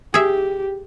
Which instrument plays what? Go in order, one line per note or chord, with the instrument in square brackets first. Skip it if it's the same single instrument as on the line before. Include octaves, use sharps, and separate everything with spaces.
[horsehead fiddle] G4 [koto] G#4 E5